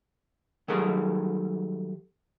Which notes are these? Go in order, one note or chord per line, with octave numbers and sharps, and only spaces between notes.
D#3 F#3 G3 A3 G#4 A#4